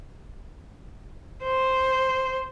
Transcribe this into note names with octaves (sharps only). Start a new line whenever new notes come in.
C5